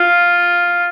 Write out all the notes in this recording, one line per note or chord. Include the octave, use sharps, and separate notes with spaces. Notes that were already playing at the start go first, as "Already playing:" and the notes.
Already playing: F4